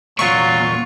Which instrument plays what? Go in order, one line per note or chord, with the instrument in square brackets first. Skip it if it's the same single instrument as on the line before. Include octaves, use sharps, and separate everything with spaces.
[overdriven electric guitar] E2 A#2 [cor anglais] F#3 [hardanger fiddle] F4 [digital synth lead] C#6